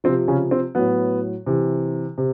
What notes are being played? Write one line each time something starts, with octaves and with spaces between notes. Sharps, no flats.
C3 F3 C4
C#3 C#4
C4
A2 F#3 B3
C3 E3
C3